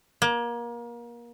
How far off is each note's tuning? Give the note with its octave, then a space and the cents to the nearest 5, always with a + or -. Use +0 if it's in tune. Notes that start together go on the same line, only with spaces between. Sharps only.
A#3 +30